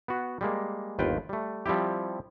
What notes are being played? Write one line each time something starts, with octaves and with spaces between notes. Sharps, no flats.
B3 F#4
G3 G#3 A#3
G1 D#2 F4 B4 G5
G3 A3
F3 G3 C4 E4 G4